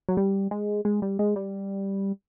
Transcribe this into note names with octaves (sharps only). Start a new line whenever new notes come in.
F#3
G3
G#3
G#3
G3
G#3
G3